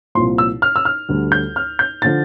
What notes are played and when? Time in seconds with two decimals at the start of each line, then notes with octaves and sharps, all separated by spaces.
0.15 C2 A#2 F3 C6
0.38 E6
0.62 F6
0.76 E6
0.85 F6
1.09 D2 D3 G3
1.32 G6
1.56 F6
1.79 G6
2.02 D3 F3 A6